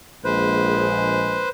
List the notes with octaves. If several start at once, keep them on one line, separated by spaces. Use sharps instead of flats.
A#1 G#3 B4 C5